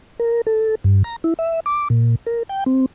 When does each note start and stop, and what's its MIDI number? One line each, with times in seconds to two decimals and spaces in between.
0.20 0.41 70
0.47 0.75 69
0.84 1.03 43
1.04 1.16 82
1.24 1.34 64
1.39 1.60 76
1.66 1.88 86
1.90 2.15 46
2.27 2.43 70
2.49 2.64 79
2.66 2.86 60